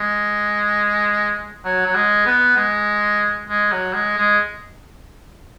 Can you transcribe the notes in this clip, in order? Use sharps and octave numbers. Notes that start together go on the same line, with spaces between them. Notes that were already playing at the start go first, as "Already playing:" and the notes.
Already playing: G#3
F#3
F#3
G#3
B3
G#3
G#3
F#3
G#3
G#3